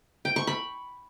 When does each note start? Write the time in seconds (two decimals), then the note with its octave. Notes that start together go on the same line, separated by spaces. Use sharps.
0.25 G5
0.36 C#6
0.47 B5